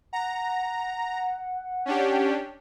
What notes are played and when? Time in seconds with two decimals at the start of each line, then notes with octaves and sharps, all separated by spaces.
0.13 F#5 A#5
1.86 C#4 D4 G4